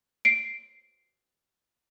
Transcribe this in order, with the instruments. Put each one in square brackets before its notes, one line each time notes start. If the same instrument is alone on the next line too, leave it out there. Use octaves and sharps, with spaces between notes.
[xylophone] C7 D7